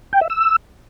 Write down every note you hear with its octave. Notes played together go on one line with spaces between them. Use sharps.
G5
E5
E6